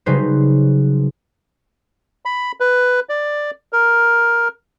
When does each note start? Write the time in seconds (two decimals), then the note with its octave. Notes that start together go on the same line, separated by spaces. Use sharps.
0.06 C#3 F#3 G3 D#4 B4 C5
2.25 B5
2.60 B4
3.09 D5
3.73 A#4